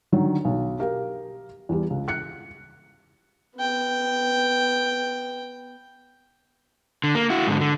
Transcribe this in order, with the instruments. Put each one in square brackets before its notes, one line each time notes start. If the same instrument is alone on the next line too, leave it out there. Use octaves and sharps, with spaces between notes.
[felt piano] D3 D#3 F#3
B1
G4 A#4 F5
E2 G3
C#2
F#6 C#7
[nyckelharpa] B3 G5
[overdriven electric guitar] D3
A#3
E4 F#4
G#2 D3
D3